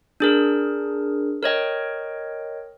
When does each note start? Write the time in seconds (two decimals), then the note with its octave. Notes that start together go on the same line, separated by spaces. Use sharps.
0.20 D4 G#4 A#4
1.43 A#4 C#5 D#5 G5